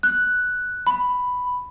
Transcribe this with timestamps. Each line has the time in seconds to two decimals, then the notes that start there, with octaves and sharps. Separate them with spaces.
0.03 F#6
0.87 B5